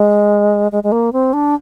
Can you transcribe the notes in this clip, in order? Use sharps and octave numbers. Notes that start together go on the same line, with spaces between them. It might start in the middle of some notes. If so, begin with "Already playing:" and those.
Already playing: G#3
G#3
G#3
A#3
C4
D4